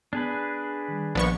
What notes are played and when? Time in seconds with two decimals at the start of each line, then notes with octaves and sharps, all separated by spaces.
0.13 B3 D4 G#4 B4 A5
0.88 D#3 G3
1.15 A#1 F3 A#3 B3 D4 D5 C#6